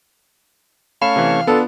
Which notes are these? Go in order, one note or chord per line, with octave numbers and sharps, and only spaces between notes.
A3 C#4 C#5 F5 B5 E7
C3 E3
B3 D4 F4 A4